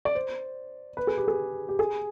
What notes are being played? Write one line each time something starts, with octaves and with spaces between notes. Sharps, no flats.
D5
C5
B4
G#4
G4
G#4
G4
G#4